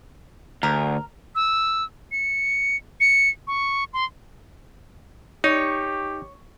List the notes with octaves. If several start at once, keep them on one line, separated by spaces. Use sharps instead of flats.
D2 A#4
E6
C#7
C#7
C#6
C6
D#4 G4 C#5